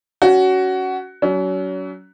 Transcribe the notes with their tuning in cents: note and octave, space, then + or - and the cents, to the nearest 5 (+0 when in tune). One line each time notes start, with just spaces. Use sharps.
C#4 +20 F#4 +15
F#3 +20 C#4 +35